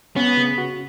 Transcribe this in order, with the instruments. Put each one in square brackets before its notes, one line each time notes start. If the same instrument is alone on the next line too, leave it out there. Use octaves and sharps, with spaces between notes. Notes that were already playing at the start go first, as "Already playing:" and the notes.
[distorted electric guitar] B3 [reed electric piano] C#4
[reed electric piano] C#3
F#4